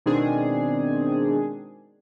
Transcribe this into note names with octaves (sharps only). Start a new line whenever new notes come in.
B2 D#3 G#3 C4 D4 G#4